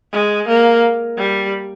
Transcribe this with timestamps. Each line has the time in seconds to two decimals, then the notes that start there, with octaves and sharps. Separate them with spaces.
0.12 G#3
0.48 A#3
1.17 G3